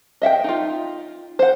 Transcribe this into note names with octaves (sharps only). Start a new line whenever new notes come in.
D#5 E5 F#5 G5
D#4 F4
C5 F#5